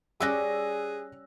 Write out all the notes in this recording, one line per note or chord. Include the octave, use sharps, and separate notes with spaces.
G3 C#4 G4 G#4 E6 F#6 A#6